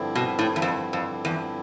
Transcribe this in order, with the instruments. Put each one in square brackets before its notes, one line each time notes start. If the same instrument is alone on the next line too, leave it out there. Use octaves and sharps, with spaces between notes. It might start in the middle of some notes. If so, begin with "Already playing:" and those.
Already playing: [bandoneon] G2 D3 F3 C4 E4
[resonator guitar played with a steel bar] B2
A2
E2
F2
F2
E2